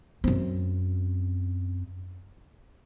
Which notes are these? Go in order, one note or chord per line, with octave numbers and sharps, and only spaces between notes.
F#2 C4